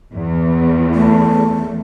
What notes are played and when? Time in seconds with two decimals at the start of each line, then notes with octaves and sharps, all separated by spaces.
0.15 E2
0.94 A3